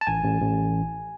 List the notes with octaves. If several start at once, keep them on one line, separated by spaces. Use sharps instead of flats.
A5
A1 G#5
A1
A1